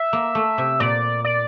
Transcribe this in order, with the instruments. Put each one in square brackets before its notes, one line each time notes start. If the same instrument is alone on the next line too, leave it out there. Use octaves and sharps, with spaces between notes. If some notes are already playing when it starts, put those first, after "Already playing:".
Already playing: [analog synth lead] E5
[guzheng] A#3
A3
C3
[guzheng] A#2 [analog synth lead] D5
[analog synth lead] D5